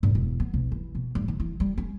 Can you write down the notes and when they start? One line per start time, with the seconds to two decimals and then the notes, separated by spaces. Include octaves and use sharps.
0.03 G2
0.15 E1
0.40 B3
0.54 B1
0.72 E3
0.95 B2
1.15 G2
1.28 D#3
1.40 E3
1.60 G3
1.78 C#4